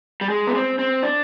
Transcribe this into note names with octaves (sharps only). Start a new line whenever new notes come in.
G3
G#3
B3
C4
C4
D4